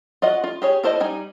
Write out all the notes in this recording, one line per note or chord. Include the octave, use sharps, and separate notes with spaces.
F4 F#4 D#5 F#5
F4
G4 G#4 C#5
E4 A4 C5 C#5 D#5
G3 D#4 G#5